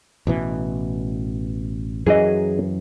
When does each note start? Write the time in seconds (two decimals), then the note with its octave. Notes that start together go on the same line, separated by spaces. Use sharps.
0.27 A1 B2 E3
2.06 F#2 E3 F#3 G#4 D#5